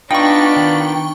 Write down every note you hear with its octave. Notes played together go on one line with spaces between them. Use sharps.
B3 D4 D#4 F4 D5 G5 B5 C#6
D#3